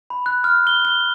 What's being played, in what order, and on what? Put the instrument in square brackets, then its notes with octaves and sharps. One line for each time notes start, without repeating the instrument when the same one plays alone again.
[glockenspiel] B5
F#6
F6
G7
G7